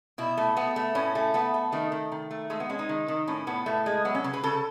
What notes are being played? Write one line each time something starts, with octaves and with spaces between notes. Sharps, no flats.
B2 E4
A3
A3 B3
A3
A2 C#4
A3
A3 B3
A3
D#3 A3
D#3
D#3
A3
G#3 A3
B3
G#3 C#4
D#4
D#3
D#3
A2 C#4
A2 B3
A2 A3
G#3
F#3 B3
C#4
C#3
B4
C#3 A4